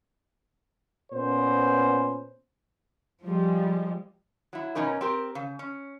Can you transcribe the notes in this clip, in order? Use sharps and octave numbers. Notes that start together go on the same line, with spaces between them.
A#2 B3 C#4 C5
F3 G3 G#3
F#3 E4
B2 F#3 C#4 D#4 A#4
C4 G4 A#4
C#3
C#4